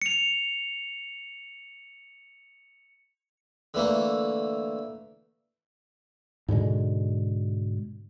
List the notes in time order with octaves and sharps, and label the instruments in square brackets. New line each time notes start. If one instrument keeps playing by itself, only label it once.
[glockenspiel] C#7 F7
[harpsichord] D3 E3 A3 A#3
[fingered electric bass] G#2 B2 D3 G#3